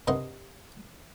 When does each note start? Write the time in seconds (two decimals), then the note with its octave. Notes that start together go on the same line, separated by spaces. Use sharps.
0.07 G2 C3 A#4 D#5 F#5 C6